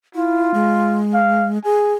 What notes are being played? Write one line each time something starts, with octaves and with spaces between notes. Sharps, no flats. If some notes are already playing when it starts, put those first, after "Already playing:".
E4 F4
G#3
F5
G#4 G#5